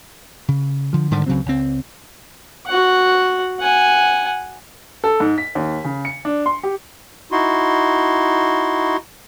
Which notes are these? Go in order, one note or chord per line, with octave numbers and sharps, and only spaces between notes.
C#3
D3 F3
G#2 D3 D#3 G3
C#2 C#3 F#3 C4
C#2 C4
F#4 F#5
F#5 G#5
A4
G#2
B6
D#2
C#3
C#7
D4
C6
G4
D#4 E4 F#4 C6